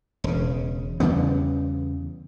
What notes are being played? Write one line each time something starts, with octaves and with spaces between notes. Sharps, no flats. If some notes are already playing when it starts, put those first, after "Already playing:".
E1 C#3
E2 C#3 G3 B3